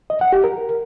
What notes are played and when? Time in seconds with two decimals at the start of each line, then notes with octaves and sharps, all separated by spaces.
0.10 D#5
0.21 F#5
0.33 G4
0.44 A#4